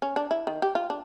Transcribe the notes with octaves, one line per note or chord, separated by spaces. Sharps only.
C#4
D4
E4
D#3
G4
F4
D4